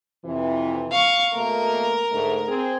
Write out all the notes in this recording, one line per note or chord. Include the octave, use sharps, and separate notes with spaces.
F2 C3 E3
F5 C#6
B2 A3 A#3 A#4
G#2 D3 A3
C4 G#4